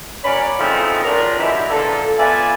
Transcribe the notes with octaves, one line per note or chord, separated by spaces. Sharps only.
C#4 F#4 A#4 B4 C#5 D5
C#3 E3 F3 A3 C4 D#4
F3 F#3 D4 A#4
F#2 D3 E3 G3 G#3 E4
A#2 D3 A4
B3 F4 B4 D5 E5 G#5